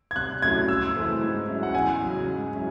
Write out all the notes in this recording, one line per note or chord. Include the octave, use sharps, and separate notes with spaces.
G#6
C3 F#6
F#3 A3 C#4 E4 G#6
F#2 E6
C#3 E3 A3 C4
G#2
F#3 C#4 E4
F#5
E2 G#5
C#3 F#3
G#2
F#3 C#4 E4